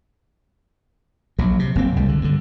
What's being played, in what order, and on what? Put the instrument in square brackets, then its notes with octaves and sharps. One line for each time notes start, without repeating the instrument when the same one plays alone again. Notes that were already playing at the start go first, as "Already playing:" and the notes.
[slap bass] A#1 F#3
C3
F#1 A#3 C4
C2 G3 G#3
D3
G2 D3